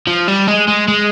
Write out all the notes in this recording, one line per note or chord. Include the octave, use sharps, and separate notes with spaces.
F3
G3
G#3
G#3
G#3